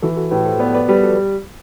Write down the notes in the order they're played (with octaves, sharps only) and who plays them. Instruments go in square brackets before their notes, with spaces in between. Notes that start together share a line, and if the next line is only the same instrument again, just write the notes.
[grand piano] E3 [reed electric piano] F#4 A4
[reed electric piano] F#4 A4
[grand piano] A2 [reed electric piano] G4 B4
[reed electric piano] A4 C5
[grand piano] B3 [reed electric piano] B4 D5
[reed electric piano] B4 D5
[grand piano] G3 [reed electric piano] G4 B4
[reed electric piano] F#4 A4